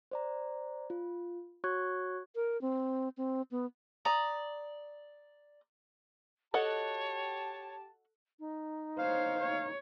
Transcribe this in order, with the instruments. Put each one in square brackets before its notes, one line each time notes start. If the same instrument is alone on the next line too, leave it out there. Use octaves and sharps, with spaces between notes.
[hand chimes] C5 D5 A#5
F4
F#4 C#5 C#6 F#6 G#6
[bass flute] A#4
C4
C4
B3
[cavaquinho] D5 A#5 D#6
[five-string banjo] F#4 D#5 F#5 [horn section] G4 A5 [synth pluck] A4 F#6 [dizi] C#5
[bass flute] D#4
[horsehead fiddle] C5 C#5 [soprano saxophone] F5
[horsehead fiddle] C#5